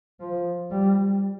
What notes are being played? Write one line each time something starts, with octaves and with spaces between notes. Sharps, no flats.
F3
G3